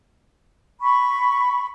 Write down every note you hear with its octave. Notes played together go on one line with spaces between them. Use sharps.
B5 C#6